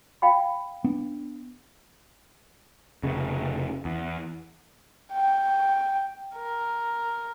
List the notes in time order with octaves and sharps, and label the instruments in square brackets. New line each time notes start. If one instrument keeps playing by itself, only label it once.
[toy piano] F5 G5 B5
[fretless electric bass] B3 D4
[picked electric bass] F1 C#3
E2
[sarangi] G5
A#4